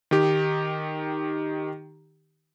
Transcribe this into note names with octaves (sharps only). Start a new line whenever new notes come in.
D#3 D#4 G4